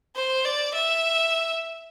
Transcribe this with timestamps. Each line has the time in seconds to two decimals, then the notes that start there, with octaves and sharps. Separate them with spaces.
0.16 C5
0.45 D5
0.74 E5